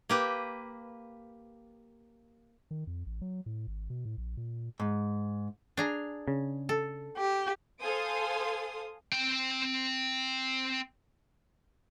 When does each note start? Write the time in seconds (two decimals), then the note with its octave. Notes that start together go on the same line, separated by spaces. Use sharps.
0.09 A#3 G4 B4
2.71 D#3
2.87 F2
3.06 A1
3.21 F#3
3.46 A2
3.67 G#1
3.90 B2
4.05 A2
4.17 A#1
4.37 A#2
4.80 G#2
5.77 D4 G#4 A#5
6.28 C#3
6.69 A4
7.17 G4
7.81 A4 C5 F5 G#5 C6 D#6
9.12 C4 G5